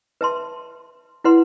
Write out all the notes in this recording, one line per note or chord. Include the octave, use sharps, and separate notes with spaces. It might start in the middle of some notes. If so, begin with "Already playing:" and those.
B4 E5 A5 C6
E4 B4 F#5 C6